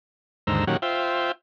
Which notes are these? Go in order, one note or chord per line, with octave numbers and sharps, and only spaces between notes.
D#2 G#2 D3 C5 A#5 E6
A#2 D#3 F#3 C#4 G4 F#5
F4 C5 E5 G5